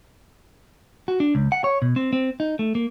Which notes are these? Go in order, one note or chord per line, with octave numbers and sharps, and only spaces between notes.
F#4
D4
C#2
F#5
C#5
B2
C4
C4
D#4
A3
A#3